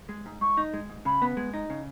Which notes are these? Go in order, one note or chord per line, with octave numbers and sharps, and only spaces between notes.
G#3
G#2
G#2 C#6
D#4
G#3
G#2
C#3 B5
B3
G#3
D#4
C#3